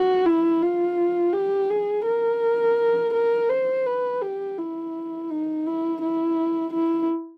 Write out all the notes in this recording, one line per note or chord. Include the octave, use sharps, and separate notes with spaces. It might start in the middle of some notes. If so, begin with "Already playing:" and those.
Already playing: F#4
E4
F4
G4
G#4
A#4
A#4
C5
B4
G4
E4
D#4
E4
E4
E4